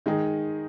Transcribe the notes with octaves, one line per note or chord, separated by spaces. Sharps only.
D#3 G#3 D#4 G#4